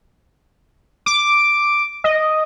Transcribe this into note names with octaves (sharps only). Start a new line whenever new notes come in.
D6
D#5